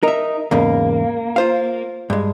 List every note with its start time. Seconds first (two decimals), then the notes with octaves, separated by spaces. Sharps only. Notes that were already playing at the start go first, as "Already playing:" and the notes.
0.03 D#4 A#4 E5
0.51 E2 G#2 C#3 A#3
1.36 F4 C5 F5
2.10 G2 G#3